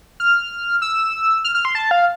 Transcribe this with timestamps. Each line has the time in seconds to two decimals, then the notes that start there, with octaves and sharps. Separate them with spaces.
0.20 F6
0.82 E6
1.44 F6
1.55 F6
1.65 C6
1.75 A5
1.91 F5